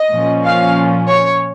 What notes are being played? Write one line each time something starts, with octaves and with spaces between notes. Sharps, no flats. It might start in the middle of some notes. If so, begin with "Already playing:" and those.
Already playing: D#5
A#2 F3 C#4
F5
C#5